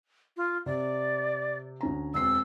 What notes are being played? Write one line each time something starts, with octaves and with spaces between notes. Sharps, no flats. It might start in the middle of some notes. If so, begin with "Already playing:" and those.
F4
C3 D5
D2 C#4 A#5
E1 C4 E6 C7